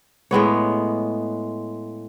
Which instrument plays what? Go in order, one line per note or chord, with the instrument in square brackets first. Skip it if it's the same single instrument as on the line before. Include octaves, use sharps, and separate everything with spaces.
[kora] A2 G#3 B3 C#5